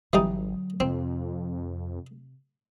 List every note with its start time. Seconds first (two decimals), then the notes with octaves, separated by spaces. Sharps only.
0.13 G#1 D3 E3 F#3 G3 D#4
0.80 F2 C3 C4